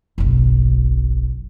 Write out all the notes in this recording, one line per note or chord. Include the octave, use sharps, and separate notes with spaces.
F#1 B1